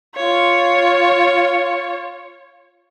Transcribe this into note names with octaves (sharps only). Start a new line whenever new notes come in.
F4 C#5